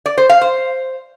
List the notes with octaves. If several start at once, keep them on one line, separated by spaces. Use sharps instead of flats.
D5
C5
F5
C5